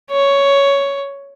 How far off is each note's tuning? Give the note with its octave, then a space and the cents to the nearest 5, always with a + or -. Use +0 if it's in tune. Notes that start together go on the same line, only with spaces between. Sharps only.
C#5 +10